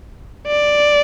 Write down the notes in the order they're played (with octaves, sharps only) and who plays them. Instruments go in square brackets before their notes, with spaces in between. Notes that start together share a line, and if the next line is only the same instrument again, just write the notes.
[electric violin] D5